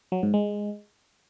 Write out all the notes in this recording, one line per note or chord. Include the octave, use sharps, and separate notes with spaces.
F#3
G#2
G#3